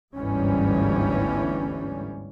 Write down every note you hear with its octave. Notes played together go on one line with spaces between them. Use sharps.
G1 D2 G#2 E3 G3 C#4